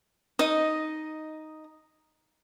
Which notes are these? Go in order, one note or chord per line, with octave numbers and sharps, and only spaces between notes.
D#4 D#5